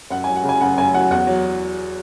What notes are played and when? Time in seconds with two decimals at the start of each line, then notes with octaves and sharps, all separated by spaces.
0.10 F#2 F#5
0.24 G#5
0.27 F#3
0.36 F#5
0.44 C#3
0.49 G#5
0.61 F#2 F#5
0.78 F#2 G#5
0.94 F#3 F#5
1.11 E2 F#5
1.27 F#3